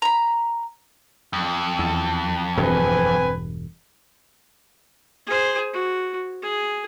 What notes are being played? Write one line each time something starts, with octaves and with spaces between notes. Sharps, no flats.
A#5 B5
F2
E2
E1 G2 C4 B4 G#5
G#4 C5
F#4
G#4